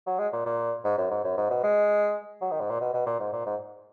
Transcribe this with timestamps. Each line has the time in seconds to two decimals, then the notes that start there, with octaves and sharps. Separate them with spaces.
0.07 F#3
0.19 G#3
0.32 A#2
0.45 A#2
0.85 G#2
0.98 F#2
1.11 G#2
1.24 F#2
1.37 G#2
1.50 B2
1.63 G#3
2.41 F#3
2.51 D#3
2.60 G#2
2.70 A#2
2.81 B2
2.93 B2
3.06 A#2
3.19 G#2
3.32 A#2
3.46 G#2